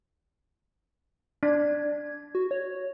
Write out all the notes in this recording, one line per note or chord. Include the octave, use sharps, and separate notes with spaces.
D4 G#6
F#4
C#5